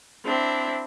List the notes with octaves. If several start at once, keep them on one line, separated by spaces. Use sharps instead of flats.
C4 D4 E4